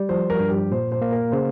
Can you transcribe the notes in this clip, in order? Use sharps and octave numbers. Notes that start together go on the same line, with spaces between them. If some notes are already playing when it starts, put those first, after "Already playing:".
Already playing: G3
F3 C5
A#4
G2
G4
A#2 C5
C5
A#3
A#4
C#3 C5